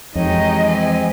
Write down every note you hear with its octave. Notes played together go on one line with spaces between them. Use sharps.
F2 E3 G#3 D#4 G4 C#5 D#5
C4 G#5